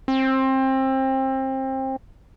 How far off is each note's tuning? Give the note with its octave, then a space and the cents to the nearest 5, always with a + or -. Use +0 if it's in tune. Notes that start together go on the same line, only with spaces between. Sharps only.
C4 +25